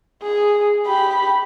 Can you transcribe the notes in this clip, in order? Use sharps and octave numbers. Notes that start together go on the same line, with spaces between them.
G#4
G4 B5